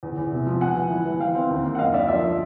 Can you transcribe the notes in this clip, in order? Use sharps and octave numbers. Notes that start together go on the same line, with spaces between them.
E2
E2
C3
F3
E3 F#5 G#5
E3
E3
E3
E3 F5 G5
C4
D#2
A#3
F#5
F#2 D#5 F5
D3 D5 E5
F3 D5 E5
F3